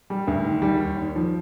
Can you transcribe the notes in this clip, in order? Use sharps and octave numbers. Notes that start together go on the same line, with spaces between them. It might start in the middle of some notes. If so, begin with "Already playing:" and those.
G3
D2
D#3
G3
D#2
D#2
F3